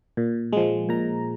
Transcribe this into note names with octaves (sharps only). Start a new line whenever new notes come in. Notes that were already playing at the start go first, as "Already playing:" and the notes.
A#2
F3 G#3
A#2 A#5